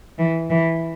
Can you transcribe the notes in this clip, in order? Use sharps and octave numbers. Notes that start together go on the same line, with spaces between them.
E3
E3